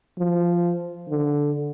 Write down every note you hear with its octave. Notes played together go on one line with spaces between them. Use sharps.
F3
D3